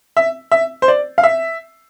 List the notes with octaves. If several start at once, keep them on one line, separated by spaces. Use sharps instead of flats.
E5
E5
C5
D5
F5
E5